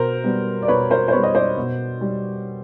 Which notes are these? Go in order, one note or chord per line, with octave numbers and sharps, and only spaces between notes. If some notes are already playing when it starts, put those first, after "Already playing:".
Already playing: B2 A#4 C5
G3 B3
D5
B2 B4 C#5
A#4 C5
C5
G3 B3 B4 C#5
D#5
C5 D5
B2
G3